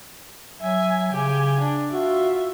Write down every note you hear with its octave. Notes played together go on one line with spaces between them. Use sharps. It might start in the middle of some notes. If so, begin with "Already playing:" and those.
F#3 E5 G#5
C#3 G4 G#5
D4
F4 F#4 E5